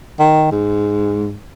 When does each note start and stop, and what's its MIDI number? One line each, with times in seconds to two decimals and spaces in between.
0.19 0.51 51
0.51 1.35 44